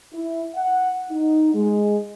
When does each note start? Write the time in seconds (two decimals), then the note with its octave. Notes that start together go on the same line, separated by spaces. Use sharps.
0.13 E4
0.56 F#5
1.10 D#4
1.55 G#3